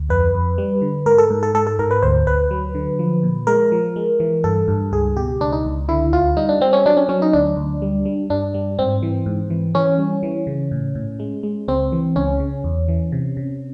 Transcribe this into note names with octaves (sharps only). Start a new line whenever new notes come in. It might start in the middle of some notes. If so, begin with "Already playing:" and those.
Already playing: D2
F2 B4
F2
G3
D3
G#2 A#4
A4
G#2
A4
G#2 A4
A4
G#2 A#4
B4
D2 C5
D2 B4
F#3
D3
F3
A#2
G#3 A#4
F3
G#3
E3
G2 A4
G2
C#2 G#4
B2 G4
C#2 D4
D#4
C#2
D3 E4
D2 F4
G3 D#4
D4
G3 C4
C#4
F#3 D4
C#4
F#3 C#4
D#4
D2 D4
D2
G3
G3
G2 D4
G3
G#2 C4
E3
G#2
E3
E3 C#4
G3
E3
C#3
A2
A2
G#3
G#3
C#2 C4
E3
C#2 C#4
C#3
E2
E3
C3
C3